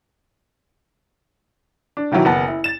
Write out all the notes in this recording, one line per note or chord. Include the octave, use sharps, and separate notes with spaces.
D4
B2 D#3 E3 F#3 E4
F#1 B3 A5
E4
A6 E7